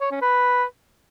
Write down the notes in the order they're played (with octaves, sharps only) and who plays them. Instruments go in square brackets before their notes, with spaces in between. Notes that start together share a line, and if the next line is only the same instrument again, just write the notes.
[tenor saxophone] C#5
C#4
B4